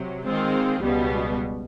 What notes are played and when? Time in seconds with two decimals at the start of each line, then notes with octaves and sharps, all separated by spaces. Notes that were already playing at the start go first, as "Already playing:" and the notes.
Already playing: C3 F#3
0.25 D#3 G#3 C4 F4
0.82 C#2 B2 G3 B3